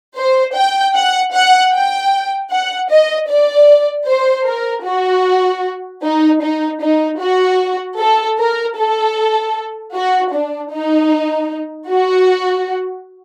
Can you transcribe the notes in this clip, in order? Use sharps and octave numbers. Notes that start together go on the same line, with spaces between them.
C5
G5
F#5
F#5
G5
F#5
D#5
D5
C5
A#4
F#4
D#4
D#4
D#4
F#4
A4
A#4
A4
F#4
D4
D#4
F#4